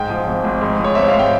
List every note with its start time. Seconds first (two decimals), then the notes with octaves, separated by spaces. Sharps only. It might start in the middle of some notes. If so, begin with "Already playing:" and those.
Already playing: G#2 G5
0.10 F3
0.27 G#1
0.44 G#1
0.61 G#2
0.80 F3 C#5
0.95 G#1 E5
1.08 F5
1.13 G#1
1.19 G5